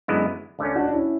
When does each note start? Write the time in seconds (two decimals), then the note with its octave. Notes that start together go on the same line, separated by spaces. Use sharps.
0.08 F#2 D3 G#3 B3 E4
0.59 D2 D3 A3 C#4
0.76 D4 F#4
0.87 D4
0.93 C#4 E4